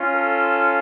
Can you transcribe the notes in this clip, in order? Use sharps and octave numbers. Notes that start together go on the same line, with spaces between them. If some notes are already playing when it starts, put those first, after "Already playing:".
Already playing: C#4 F4
A4